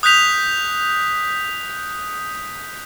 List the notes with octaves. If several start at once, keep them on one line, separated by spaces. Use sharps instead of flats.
D#6 F#6 G6 B6 F7